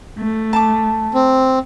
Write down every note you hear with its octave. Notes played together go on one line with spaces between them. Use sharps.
A3
A5 D6
C4